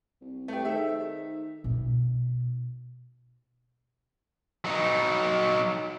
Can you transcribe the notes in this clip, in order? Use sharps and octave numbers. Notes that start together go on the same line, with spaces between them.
C2
A3 G4 B4
D#3 G#4 A4 C5 E5
B2 D#4
F#3 D#4